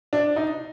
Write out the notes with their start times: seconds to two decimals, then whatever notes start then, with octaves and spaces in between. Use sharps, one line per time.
0.13 D4
0.36 D#4